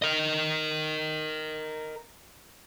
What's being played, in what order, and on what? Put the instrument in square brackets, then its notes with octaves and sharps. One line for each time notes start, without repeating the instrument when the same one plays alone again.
[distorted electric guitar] A#4 D#5